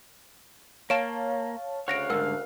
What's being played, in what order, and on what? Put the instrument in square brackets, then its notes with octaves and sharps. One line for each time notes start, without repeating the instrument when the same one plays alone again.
[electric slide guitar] A#3 [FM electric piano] C#5 F5 A5 [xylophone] D7 E7
[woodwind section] D2 C#3 F5 [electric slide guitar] C#5 [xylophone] F#5 A#6 D7 [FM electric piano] F#6
[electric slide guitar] G#2 D3 G3 [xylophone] A#4 F#5 E6